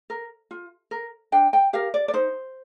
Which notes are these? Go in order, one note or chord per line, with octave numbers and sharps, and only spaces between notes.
A#4
F4
A#4
D4 G5
G5
G4 A#4 F5
D5
D5
D#4 C5